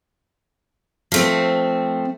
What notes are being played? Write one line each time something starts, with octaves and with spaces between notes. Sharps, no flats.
F3 A3 C4